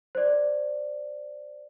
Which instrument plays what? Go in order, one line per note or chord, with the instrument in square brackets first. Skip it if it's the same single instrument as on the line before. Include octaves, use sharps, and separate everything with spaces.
[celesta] C5 D5